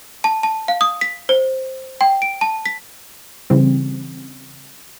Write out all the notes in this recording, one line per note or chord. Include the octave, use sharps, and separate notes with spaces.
A5
A5
F5
D#6
B6
C5
G5
D7
A5
B6
C#3 E3 G3 C4